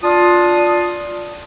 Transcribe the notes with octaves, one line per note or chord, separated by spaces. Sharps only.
D4 F4 D#6